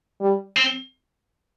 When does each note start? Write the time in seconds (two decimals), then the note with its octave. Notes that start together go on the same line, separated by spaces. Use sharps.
0.21 G3
0.57 C4